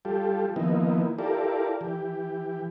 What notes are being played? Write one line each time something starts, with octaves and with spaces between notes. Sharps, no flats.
G3 F4 G4 A4
D#3 F3 A#3 B3 D#4 E4
E4 F4 G4 A4 A#4 D5
E3 G4